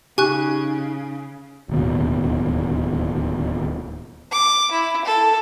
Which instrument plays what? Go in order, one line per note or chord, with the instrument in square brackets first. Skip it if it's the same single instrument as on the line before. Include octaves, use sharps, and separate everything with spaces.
[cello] C#3 [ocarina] D#4 [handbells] G4 [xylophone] G#5 C#6 F#6
[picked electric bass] D1 D#2 B2
[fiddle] D6
E4
A4